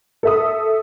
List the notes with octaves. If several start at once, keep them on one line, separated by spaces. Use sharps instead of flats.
A4 E5 D#6